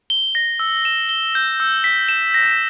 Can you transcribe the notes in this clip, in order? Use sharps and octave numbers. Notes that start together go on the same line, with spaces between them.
G7
A#6
E6
E7
G7
G6
E6
B6
E7
A#6